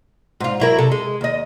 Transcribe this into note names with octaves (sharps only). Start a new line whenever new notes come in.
G#2 F4
F#3 E4 A#4
C3 A4
G#3
D#2 D#5